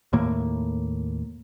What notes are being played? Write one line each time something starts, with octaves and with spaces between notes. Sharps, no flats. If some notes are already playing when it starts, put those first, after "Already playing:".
D#2 A2 A#3